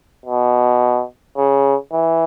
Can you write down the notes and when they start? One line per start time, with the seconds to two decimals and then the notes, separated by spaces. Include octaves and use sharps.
0.26 B2
1.37 C#3
1.92 E3